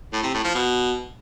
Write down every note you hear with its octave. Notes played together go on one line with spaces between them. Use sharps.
A2
C3
A2
F3
B2